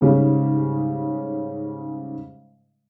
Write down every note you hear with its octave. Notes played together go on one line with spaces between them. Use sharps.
G#2 C#3 G3